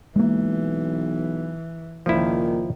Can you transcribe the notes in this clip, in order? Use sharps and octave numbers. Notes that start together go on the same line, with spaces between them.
B1 E3 G#3 A#3
C#2 A#2 D#3 F3 E4